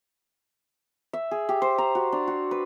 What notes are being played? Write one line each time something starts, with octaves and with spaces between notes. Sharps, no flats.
E5
G#4
G4
C5
A#5
F#4
D4
F#4
B4